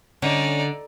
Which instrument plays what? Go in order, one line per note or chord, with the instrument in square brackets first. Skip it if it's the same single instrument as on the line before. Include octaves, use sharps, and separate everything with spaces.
[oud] D3 [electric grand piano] C#4 [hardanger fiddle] D#4 D5